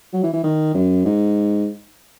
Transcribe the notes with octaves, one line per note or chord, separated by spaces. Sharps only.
F#3
E3
E3
D#3
F#2
G#2